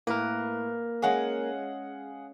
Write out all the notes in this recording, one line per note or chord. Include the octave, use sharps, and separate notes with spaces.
A2 A#3 A#4 B4
G#3 C#4 G#4 F5 F#5